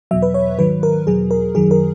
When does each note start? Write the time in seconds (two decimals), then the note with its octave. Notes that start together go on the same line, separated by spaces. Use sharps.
0.11 E2 B2 F#3 E5
0.22 B4
0.34 C#5
0.58 G#2 D#3 F#3 B4
0.83 A#4
1.07 E2 B2 F#3 G#4
1.31 A#4
1.55 F#2 D#3 F#3 G#4
1.71 A#4